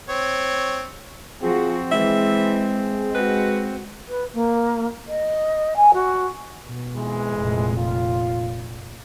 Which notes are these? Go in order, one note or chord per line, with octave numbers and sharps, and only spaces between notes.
C4 C#5
F3 C4 F4 F#4 G#4
E3 G#3 E5
F#4 B4
B4
A#3
D#5
G#5
F#4
B2
F2 E3 G#3
F1 A#2
F4